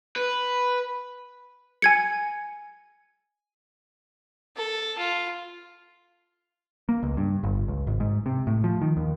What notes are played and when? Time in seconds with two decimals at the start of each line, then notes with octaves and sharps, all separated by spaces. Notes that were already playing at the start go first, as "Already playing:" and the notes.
0.16 B4
1.82 G#5 G#6 C#7
4.56 A4
4.98 F4
6.89 A#3
7.03 C#2
7.17 G2
7.44 G1
7.68 C#2
7.87 G#1
8.00 G#2
8.26 C3
8.47 A2
8.64 F3
8.82 D#3
8.97 D#2